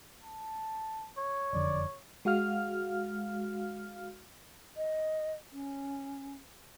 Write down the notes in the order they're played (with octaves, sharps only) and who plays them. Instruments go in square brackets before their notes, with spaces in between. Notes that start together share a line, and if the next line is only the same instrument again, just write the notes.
[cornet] A5
[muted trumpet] C#5
[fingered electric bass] F#1 F2 D3 [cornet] D5
[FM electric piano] G#3 F#4 F5 F6
[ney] D#5
C#4